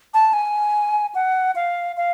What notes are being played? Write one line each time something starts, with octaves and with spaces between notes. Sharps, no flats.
A5
G#5
F#5
F5
F5